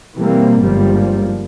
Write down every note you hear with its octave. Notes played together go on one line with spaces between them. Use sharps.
B2 E3 G3 A#3 C4
G1 G#2 F3 G3 A#3